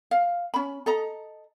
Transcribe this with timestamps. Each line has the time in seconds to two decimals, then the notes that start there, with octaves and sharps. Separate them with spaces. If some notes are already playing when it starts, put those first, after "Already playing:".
0.11 F5
0.54 C#4 B5
0.86 A4 D#5 A#5